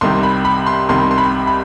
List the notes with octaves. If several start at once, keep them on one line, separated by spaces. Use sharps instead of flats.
C2 C3 D#3 G3 C6
B5
B5
C6
C2 C3 D#3 G3 C6
C6
B5
B5